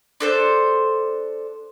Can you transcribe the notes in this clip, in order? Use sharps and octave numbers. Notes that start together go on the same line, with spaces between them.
D4 A4 C5